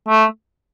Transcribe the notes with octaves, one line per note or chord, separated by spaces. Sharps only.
A3